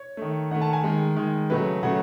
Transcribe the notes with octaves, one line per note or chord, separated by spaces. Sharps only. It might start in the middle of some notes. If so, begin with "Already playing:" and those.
Already playing: C#5
D#3 A3
D#3 A3 F#5
A5
G#5
D#3 G#3
D#3 G#3
C#3 F#3 A3 B4
C#3 F#3 A3 F#5